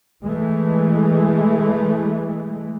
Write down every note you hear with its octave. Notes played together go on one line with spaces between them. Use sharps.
E3 G#3 A3